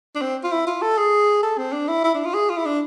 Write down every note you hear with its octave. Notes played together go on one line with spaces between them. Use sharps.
D4
C4
F4
E4
F4
A4
G#4
A4
C4
D4
E4
E4
D4
F4
G#4
F4
E4
D4